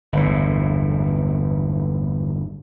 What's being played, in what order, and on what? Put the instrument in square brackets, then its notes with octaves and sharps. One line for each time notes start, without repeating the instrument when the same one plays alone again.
[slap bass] G1 E2 A2